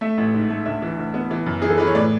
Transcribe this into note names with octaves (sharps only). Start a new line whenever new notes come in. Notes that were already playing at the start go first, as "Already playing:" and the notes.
A3 E5
A1
G#2
A3
D2 E5
E3
D2
B3
E3
F#2
E3 G#4
A4
E3 B4
C#5
A2 D5